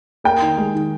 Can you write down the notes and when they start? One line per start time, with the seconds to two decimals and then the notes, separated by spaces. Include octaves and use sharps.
0.24 A#3 G5
0.41 D#3
0.58 G#3
0.74 D#3